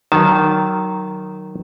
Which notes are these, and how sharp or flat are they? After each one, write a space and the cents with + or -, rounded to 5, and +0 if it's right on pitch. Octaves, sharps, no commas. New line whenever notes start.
D#3 -10 F#3 +15 A5 -20